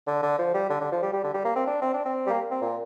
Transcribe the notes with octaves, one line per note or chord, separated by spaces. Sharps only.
D3
D3
F3
G3
D3
D3
F3
G3
G3
D3
G3
A#3
C4
D4
C4
D4
C4
G3
A#3
C4
A#2